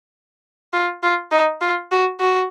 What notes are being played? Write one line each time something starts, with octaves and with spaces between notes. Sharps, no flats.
F4
F4
D#4
F4
F#4
F#4